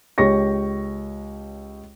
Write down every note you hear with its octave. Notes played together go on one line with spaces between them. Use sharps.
C#2 G4 C#5 C#6 A#6